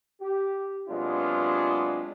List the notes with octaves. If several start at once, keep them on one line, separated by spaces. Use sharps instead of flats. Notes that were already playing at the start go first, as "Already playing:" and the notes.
G4
C3 F#3 G#3 B3 D4 F4